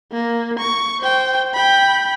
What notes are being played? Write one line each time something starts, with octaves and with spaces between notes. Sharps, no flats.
A#3
C#6
C5 G5
G5 B5